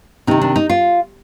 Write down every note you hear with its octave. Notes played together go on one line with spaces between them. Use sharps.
C3 D#3 D#4
D4
D#4
F4